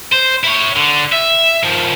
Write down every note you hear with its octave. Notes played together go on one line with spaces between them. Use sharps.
C5
E4 C#5
D3
E5
D#3 F3